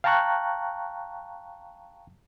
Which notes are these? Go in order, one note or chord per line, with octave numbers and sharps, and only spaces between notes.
F5 G5 A5 A#5 C#6 F#6